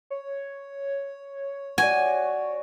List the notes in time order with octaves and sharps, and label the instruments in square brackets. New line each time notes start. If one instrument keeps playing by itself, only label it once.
[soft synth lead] C#5
[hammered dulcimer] F#4 D5 [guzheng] G#5